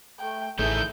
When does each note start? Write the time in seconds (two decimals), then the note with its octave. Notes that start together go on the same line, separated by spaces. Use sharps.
0.20 A3 G5
0.59 A1 D#3 A3 E4 G#4 A4 G6